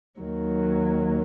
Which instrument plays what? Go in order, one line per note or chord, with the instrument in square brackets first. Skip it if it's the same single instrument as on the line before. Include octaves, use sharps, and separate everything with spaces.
[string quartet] D#2 D#3 F#3